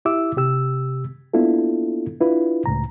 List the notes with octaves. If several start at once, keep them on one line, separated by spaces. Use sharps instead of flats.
E4 G4 E5 D6 E6
C3 G4 E6
A#3 B3 D4 E4 F4 A4
D4 E4 F4 B4
C#2 A2 A#5